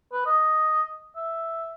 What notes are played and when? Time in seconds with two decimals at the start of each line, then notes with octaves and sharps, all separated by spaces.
0.13 B4
0.26 D#5
1.16 E5